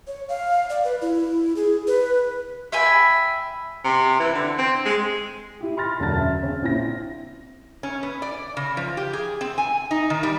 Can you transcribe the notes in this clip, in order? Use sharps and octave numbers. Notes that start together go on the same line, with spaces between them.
C#5
F5
D5
B4
E4
G#4
B4
E5 G5 G#5 B5
C3
E3
D3
C4
G#3
E4 G4
B5 C6 F6 A6 A#6
E1 F#2 D3 A5 A6
E5
C#3 C4 C#4
A#1 C4 E4 C5 A#6
C#4
B3
D5
C#3
F3
G4
G#4
C4
G#5
D#4
D#3
G3